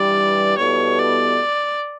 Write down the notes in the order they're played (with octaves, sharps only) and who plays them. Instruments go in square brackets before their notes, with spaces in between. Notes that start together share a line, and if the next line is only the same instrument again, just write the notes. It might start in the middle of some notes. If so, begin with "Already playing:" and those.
Already playing: [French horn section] G2 E3 G3 [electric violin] D5
[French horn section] B2 G3 B3 E4 A4 [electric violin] C#5
[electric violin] D5